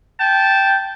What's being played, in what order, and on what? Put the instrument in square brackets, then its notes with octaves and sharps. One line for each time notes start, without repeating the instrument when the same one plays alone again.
[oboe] G5 [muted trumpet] A5